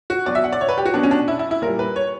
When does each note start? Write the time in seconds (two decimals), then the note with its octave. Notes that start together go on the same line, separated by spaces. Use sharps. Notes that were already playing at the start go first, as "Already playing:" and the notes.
0.10 F#4
0.26 B2 F#3 D5
0.35 E5
0.44 F#5
0.53 D5
0.61 C#5
0.69 B4
0.78 G4
0.86 F#4
0.94 B2 F#3 D4
1.03 C#4
1.11 D4
1.28 E4
1.39 E4
1.51 E4
1.62 A#2 G3 A#4
1.79 B4
1.96 C#5